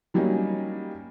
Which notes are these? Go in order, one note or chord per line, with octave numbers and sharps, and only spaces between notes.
F#3 G3 A#3 C#4 D#4